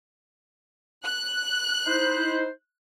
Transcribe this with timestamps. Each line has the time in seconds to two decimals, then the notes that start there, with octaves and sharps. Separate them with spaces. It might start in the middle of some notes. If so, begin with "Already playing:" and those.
1.05 F#6
1.87 D#4 E4 C5